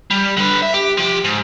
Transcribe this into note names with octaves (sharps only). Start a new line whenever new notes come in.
G3
D3 B4
E5
G4
F3 G4
G#2